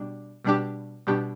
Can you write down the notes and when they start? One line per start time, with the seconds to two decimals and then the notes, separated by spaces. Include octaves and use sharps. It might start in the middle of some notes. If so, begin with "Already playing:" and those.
Already playing: B2 G3 D4
0.45 B2 G3 D4 G4
1.07 B2 G3 D4 G4